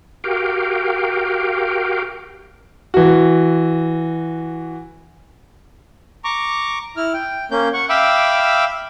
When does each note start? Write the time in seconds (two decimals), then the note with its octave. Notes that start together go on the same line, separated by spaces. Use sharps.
0.24 F#4 G4 A#4 F5 G5
2.94 E3 F#4
6.25 A#5 C#6 D6
6.97 E4 F6
7.14 G5
7.51 A#3 C#4 G6
7.74 F#5 C#6
7.89 E5 F5 G5 B5 D6 E6